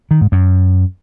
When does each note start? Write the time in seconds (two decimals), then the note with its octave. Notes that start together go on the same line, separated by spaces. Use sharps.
0.11 D#3
0.21 G#2
0.32 F#2